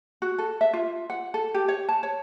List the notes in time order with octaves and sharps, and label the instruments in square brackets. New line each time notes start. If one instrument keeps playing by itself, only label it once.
[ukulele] F#4
A4
E5
F4
F#5
A4
G4
C#5
A5
C#5